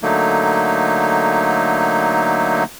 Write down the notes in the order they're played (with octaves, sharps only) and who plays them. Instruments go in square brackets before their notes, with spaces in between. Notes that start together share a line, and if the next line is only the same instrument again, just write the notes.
[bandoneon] D3 F#3 A3 A#3 D#4